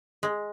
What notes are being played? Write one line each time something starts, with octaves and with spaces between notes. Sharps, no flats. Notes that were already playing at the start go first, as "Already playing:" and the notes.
G#3